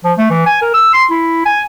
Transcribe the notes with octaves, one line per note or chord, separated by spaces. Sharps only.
F3
A3
E3
G#5
A#4
E6
C6
E4
G#5